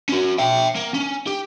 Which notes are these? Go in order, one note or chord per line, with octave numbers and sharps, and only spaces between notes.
C#4 F#4
E5 G5
A#3
C#4
G4